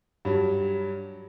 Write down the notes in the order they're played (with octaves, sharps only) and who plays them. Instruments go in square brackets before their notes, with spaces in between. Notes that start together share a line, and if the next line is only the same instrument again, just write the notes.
[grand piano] G2 F#3 G3